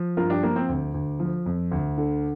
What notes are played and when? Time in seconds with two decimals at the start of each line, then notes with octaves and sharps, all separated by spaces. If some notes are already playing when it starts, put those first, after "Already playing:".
Already playing: F3
0.17 G2 F4 A#4
0.30 D4 G4
0.43 F3 A#3
0.56 C4
0.69 D2
0.94 D2
1.20 F3
1.46 F2
1.71 D2
1.98 D3